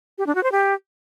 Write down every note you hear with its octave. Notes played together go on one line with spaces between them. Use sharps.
G4
D4
F#4
C5
G4